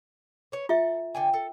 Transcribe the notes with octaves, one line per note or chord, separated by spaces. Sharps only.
B4 C#5
F4 A4 E5
D3 G5 G#5
A4